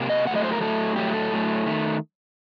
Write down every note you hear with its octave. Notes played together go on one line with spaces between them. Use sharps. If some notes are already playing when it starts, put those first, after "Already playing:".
Already playing: C3 A#3
D#5
A2 F#3 A3 F#5
D#5
C5
A#4
A2 F#3 A3 A4
A2 F#3 A3 G4
A4
A2 F#3 A3
D#3 A3